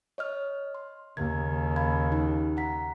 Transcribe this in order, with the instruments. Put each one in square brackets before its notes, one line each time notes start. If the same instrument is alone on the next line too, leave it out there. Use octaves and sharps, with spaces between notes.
[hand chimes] C#5 D#5 F6
C6
[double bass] D#2 C#3 [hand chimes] G#6
[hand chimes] F5 B5 G#6
D#4
F#5 A#5 B6